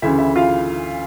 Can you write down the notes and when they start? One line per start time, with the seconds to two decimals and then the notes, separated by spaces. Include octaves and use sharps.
0.02 D2 C#3 E3 E4 E5
0.18 E4 E5
0.35 F4 F5